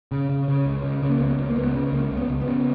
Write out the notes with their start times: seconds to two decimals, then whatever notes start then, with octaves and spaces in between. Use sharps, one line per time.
0.12 C#3
0.30 C#3
0.48 C#3
0.66 C#2
0.84 C#3
1.02 C#3
1.09 A#3
1.20 C#2 B3
1.38 C#2
1.50 A#3
1.56 C#2 B3
1.75 C#3
1.93 C#2 A#3
2.11 C#2
2.17 B3
2.29 C#2
2.41 B3
2.48 C#3